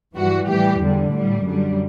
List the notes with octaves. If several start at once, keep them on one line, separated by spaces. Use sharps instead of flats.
G2 E3 G3 F#4
A2 E3 G3 G4
E2 D3 G3
A2 G3
F#2 D3 G3